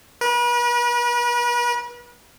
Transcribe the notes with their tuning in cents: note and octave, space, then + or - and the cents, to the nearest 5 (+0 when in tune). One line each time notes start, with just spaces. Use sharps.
B4 -40